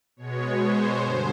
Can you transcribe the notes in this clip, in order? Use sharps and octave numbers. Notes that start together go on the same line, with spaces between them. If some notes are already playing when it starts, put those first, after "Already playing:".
B2 G#3 B3 C#5
C5
G2 D3